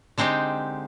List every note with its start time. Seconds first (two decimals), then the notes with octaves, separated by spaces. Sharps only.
0.18 D3 G#3 C4 D#4 G4